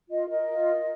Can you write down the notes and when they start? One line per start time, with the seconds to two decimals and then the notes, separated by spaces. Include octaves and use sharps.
0.09 F4 D#5
0.29 A#4 D#5
0.47 F4
0.67 A#4